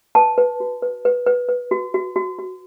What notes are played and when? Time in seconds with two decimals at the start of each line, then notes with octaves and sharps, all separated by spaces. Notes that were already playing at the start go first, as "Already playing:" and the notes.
0.15 B4 A5
0.38 B4
0.60 F#4
0.82 B4
1.05 B4
1.26 B4
1.49 B4
1.71 F#4
1.94 F#4
2.16 F#4
2.39 F#4